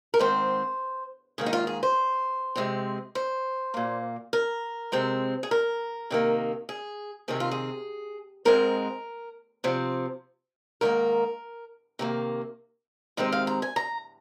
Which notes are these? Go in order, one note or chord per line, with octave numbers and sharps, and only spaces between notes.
A#4
G#2 D#3 C4 C5
G#2 D#3 A#3 G#4
D#4
F4
G#4
C5
C3 G#3 C4
C5
A#2 A#3
A#4
C3 G#3 C4
G#4
A#4
C3 D#3 A#3
G#4
C3 D#3 C4 G#4
F4
G#4
G#2 G#3 C4 A#4
C3 F3 C4
G#2 D#3 A#3 A#4
C3 D#3 A#3
C3 D#3 G#3 C4 D#4
F5
A#5
G#5
A#5